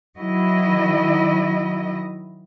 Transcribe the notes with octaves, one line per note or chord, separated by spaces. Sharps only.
D#3 F#3 E4 D#5